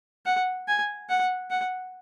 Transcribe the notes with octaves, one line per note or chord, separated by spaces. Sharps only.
F#5
G#5
F#5
F#5